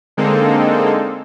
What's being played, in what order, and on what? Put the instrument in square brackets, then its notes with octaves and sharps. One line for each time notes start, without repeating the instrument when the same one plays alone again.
[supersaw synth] D3 G#3 A#3 C4 D#4 A4